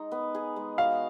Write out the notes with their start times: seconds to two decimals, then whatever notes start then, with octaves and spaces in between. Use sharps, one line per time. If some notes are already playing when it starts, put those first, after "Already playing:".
Already playing: G#3 D#4
0.12 B3
0.35 G#4
0.56 G#3
0.78 F#4 F5